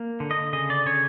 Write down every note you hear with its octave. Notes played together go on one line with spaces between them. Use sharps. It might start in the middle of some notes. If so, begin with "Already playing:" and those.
Already playing: A#3
D3
D#5
C#3 D#5
D5
C#3 C#5